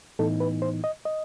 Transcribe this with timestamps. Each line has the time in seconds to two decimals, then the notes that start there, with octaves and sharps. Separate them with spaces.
0.19 A2 E3 B3 D#4 A4
0.40 B4
0.62 C5
0.84 D#5
1.05 D#5